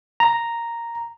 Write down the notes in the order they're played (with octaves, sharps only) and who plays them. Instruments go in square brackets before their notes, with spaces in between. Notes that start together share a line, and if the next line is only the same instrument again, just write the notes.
[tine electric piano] A#5